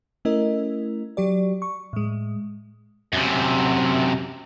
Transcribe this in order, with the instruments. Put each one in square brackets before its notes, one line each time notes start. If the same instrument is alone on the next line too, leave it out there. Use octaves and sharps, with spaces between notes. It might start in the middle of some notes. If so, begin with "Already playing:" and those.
[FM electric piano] A3 C#4 E4 A#4 D#5
F#3 G4 D5
C#6
A2 G#3
[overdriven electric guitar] F#2 C3